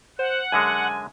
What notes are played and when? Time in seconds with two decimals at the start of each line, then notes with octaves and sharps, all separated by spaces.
0.19 C5 F#5
0.52 F#2 D3 G#3 G#5